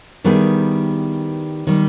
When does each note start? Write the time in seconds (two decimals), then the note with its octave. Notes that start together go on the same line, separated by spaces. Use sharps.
0.24 D#3 G3 B3 E4 G#4
1.67 D#3 G3